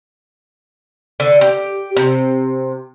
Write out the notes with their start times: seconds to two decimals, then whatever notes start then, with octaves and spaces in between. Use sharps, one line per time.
1.20 D3
1.41 G4
1.96 C3